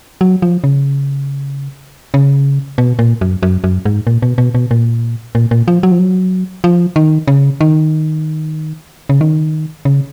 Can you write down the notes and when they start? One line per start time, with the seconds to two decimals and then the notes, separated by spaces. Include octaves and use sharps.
0.21 F#3
0.42 F3
0.64 C#3
2.14 C#3
2.78 B2
2.99 A#2
3.21 F#2
3.43 F#2
3.64 F#2
3.85 G#2
4.07 A#2
4.22 B2
4.38 B2
4.55 B2
4.71 A#2
5.35 A#2
5.51 A#2
5.68 F3
5.83 F#3
5.92 F3
5.99 F#3
6.64 F3
6.96 D#3
7.28 C#3
7.61 D#3
9.09 C#3
9.21 D#3
9.85 C#3